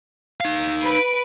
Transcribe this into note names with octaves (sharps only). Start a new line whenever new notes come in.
D#4 F5
B4 D7